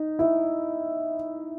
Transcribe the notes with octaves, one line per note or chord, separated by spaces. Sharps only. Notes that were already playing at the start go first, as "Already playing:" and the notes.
Already playing: D#4
E4